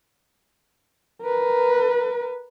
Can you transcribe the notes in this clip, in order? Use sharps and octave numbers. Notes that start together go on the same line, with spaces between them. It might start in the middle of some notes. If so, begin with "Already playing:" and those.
A#4 B4